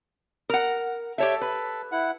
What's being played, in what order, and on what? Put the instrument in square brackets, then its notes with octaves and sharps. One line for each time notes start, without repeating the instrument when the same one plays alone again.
[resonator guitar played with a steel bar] A#4 F#5
[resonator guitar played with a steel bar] G4 C#5 E5 [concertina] A4
[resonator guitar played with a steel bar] B4
[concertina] E4 F#5